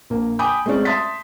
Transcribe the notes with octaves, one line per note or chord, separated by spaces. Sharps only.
A#1 A#3
G5 G#5 B5 D6 D#6 G6
G#3 A3 C4 C#4 D5
E5 A5 C6 D#6 A6 B6